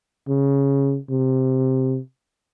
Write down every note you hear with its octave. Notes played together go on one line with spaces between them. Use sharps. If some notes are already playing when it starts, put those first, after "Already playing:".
C#3
C3